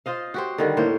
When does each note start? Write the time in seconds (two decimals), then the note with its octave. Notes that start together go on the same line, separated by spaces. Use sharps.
0.06 F4 C5 D#5 F5
0.34 F#4 G4 C5
0.58 D3 D#3 G3
0.77 A2 A#3 C5 C#5